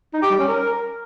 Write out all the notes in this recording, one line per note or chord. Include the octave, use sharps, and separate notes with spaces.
D#4
G4
G3
C#4
A#4